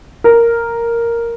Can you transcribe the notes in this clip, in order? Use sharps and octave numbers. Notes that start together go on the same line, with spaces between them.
A#4